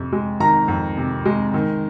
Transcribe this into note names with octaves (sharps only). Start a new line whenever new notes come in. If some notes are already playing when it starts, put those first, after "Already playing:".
Already playing: F2 C3
G#3
D#3 A#5
F2
C3
G#3
D#3